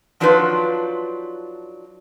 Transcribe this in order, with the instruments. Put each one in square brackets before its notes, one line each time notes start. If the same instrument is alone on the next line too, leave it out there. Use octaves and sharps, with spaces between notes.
[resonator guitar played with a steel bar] F3 F#3 D4 D#4 F4 B4